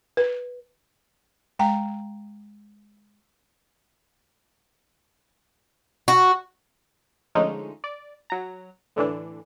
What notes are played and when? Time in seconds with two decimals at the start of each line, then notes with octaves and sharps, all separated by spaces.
0.17 B4
1.59 G#3 G5 A#5
6.08 F#4
7.35 D3 F3 G#3 A3 C#4 D#4
7.84 D5
8.30 F#3 A#5
8.96 A2 D3 E3 D4